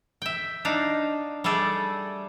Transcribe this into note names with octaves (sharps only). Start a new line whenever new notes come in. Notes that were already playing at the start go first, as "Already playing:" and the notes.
E5 G5
D4 D#4 F5
G3 A3 G#4 A4 D5